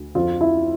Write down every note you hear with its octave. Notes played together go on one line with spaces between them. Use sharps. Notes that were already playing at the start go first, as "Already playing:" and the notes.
Already playing: D2
F2 F4
E4